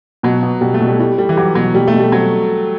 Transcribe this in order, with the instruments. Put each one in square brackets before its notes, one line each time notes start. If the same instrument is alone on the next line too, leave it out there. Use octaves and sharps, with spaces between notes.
[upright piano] B2 [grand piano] F#3
[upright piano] B3
[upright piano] B2 [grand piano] G3
[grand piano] A3
[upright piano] B2
[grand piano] G3
[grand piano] G3 [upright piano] E4
[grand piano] G3 [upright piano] A3
[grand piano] E3
[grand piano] F#3 [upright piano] G4
[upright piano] B2 [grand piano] F#3
[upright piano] B2 [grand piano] G3
[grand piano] A3
[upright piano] B2
[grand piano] G3
[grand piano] F#3 [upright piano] C4